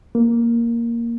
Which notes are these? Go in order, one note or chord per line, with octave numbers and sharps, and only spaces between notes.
A#3